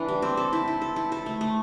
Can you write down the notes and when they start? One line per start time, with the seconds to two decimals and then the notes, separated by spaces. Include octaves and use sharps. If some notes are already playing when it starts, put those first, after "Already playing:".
Already playing: E3 D4
0.08 G3
0.22 C4
0.37 A4
0.53 E4
0.68 E4
0.81 A4
0.96 E4
1.12 A4
1.26 A3
1.41 A3